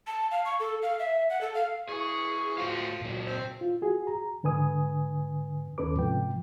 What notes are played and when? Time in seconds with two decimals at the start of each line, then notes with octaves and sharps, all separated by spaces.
0.07 A5
0.31 F5
0.45 C#6
0.60 A4
0.83 F5
0.99 E5
1.30 F#5
1.41 A4
1.55 F5
1.89 E3 G#4 C#6
2.58 F3 A3 F4 F#4 F5
3.01 A#2 F#3
3.26 C4 C5
3.61 F4
3.82 F#4 G#4
4.07 A#5
4.43 G#2 D3 B4 G#5 D#6
5.78 D#2 C#4 A4 B4 D6
5.95 G#2 C3 F3 G5